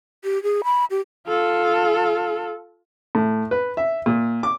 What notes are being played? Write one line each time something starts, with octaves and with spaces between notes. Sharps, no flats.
G4
G#4
B5
G4
F4 A4
A2
B4
E5
A#2
D6